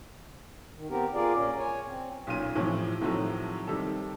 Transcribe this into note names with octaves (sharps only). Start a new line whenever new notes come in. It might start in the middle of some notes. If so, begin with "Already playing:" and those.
D#3
B3 C4 G4 A#4
F4 G#4 A#4 D5
A#2 C#4
C#5 G#5
C4
B1 A#2 C#4 D#7
A2 C3 E3 F3
A2 C3 D#3 F3 F#3 A3
C3 D#3 G3 A4